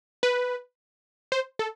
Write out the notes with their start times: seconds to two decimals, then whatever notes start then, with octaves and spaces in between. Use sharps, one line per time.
0.23 B4
1.32 C5
1.59 A4